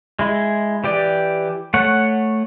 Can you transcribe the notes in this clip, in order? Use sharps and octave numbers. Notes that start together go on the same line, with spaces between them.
G#3 E4
E3 G4 D5
A3 C#5 F#5